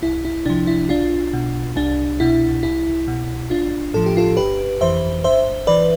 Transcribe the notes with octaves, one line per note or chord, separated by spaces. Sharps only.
C2 E4
E4
C3 F3 D4
E4
B1 D4 F4
B2
C2 D4
B2 E4
C2 E4
B2
A1 D4 F4
A2 F3 A4
G4
F4 A4
G1 G4 B4
F2 E3 C5 E5
G1 C5 E5
E3 B4 D5